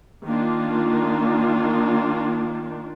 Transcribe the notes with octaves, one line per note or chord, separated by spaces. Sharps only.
D#3 A#3 D4 F4